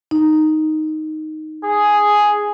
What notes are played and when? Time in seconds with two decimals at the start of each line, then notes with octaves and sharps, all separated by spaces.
0.11 D#4
1.65 G#4